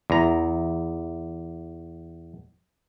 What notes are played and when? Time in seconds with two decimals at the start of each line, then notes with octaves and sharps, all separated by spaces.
0.10 E2 A#5